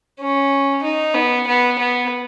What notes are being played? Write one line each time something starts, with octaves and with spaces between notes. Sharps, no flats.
C#4
D#4
B3
B3
B3